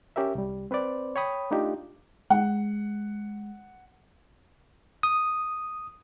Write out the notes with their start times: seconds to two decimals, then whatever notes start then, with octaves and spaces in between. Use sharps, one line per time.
0.16 C#4 G4 A#4 E5
0.35 C2 G3
0.71 C4 B4 C5 D5
1.16 C#5 G5 B5 D#6
1.51 A3 D4 D#4 F4 G4
2.30 G#3 F#5
5.03 D#6